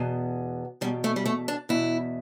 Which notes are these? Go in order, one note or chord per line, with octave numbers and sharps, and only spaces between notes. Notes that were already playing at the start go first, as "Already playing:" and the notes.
Already playing: E2 B2
E2 B2 G3
A3
G3
A3
D4
E2 B2 E4